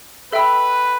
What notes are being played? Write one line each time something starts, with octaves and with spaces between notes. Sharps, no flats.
A4 B4 E5 G5 B5 E6